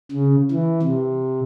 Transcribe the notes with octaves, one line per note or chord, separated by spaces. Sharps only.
C#3
E3
C3